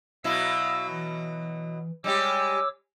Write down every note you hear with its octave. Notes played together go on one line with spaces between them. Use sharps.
B2 F#3 E4 E5 F5 E6
E3
G3 G#3 G4 C#5 D6 E6